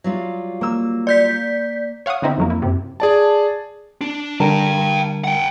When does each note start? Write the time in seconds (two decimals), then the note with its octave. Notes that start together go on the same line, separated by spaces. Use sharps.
0.04 F#3 G3 F4
0.61 A#3 E6
1.07 D5 G6 B6
2.06 C#5 F5 F#5 C#6 D#6
2.22 D3 B3 C4 D#4 E4
2.38 F2 F#3 A#3
2.50 E4
2.62 F#2 C3
3.00 G#4 D5 A5
4.01 D4
4.40 D3 G3 A#4 G5 A5
5.24 F#5 G5